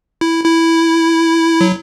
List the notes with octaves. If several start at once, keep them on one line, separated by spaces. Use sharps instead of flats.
E4
E4
F#3